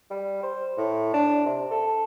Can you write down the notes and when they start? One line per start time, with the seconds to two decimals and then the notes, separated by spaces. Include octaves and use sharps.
0.10 G3
0.43 C5
0.78 A2
1.14 D4
1.46 C3
1.71 A4